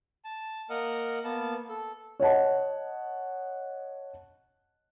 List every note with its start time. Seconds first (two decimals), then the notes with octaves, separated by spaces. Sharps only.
0.25 A5
0.70 A#3 A#4 D#5 F#5
1.24 A#3 B3 A5
1.69 A4
2.20 C#5 D#5 F#5 A5